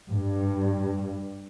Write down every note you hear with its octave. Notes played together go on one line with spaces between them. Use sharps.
G2